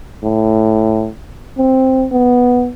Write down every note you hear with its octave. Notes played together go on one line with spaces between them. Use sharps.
A2
C4
B3